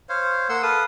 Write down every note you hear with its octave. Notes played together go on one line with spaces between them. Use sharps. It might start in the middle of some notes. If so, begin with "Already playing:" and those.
C5 C#5 F5
A#3 F#5 C6 E6
A4 B4 F5 D#6